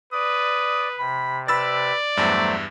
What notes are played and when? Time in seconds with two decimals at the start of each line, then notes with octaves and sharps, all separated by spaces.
0.13 B4 D5 D#6
0.99 C3 B5
1.48 B4 D5 B5 E6 A6
2.17 E2 G2 F#3 A3 C5 E5